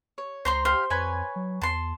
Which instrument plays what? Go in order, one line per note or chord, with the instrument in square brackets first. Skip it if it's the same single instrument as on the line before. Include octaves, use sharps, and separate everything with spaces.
[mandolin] C#5
[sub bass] C#2 [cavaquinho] C5 A#5 C6
[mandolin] G4 F5 [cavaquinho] C5
[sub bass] F2 [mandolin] B4 C#5 G#5
[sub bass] F#3
[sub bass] E2 [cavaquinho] A5 C6